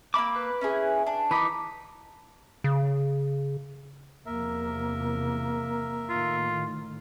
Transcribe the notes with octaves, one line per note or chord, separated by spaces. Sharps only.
A#3 D#4 B5 D6 E6
B4
C#4 E4 G#4
D4
E3 D#4 A#4 B5 D6
C#3
E2 C3 F3 A#3 A#4 E5
A2 D#3 F4